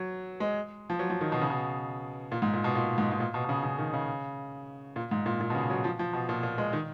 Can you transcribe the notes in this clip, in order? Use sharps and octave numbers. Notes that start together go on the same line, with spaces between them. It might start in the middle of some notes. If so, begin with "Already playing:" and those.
Already playing: F#3
G#3
F3
F#3
F3
D#3
B2
C#3
B2
A#2
G#2
A#2
B2
A#2
G#2
G#2
A#2
B2
B2
C#3
C#3
D#3
C#3
A#2
G#2
A#2
A#2
B2
C#3
F#3
F3
F3
B2
A#2
A#2
G#3
D#3